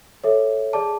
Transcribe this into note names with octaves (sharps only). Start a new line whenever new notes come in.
A4 C#5 E5
G#4 D5 A5 D6